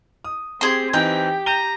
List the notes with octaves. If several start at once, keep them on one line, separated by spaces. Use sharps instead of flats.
D#6
C4 G4 G#4 C6
E3 C4 D#4 G4 G5
A#5 G6 D#7 G7